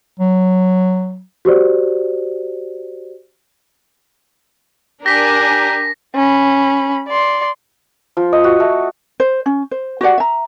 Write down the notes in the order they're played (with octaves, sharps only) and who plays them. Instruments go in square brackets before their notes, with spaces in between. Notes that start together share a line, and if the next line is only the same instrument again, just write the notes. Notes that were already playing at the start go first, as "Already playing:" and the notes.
[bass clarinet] F#3
[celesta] F#4 G4 C5 D5
[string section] D4 A#4 G#5 [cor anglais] G4 [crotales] A#6 B6
[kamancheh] C#4 B5
D5 C6
[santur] F3
D#5
F#4
A3
[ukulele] C5
C#4
C5
F#4 G4 D5 F#5
E5 A#5